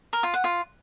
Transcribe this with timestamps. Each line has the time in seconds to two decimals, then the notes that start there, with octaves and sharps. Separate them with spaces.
0.13 A#4
0.23 F4
0.34 F#5
0.44 F4